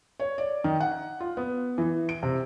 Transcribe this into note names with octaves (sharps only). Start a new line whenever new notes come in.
C#5
D5
D#3
F#5
F4
B3
E3
D7
C3